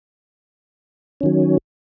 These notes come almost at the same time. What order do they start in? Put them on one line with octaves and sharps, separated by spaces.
C#4 D#3 F#3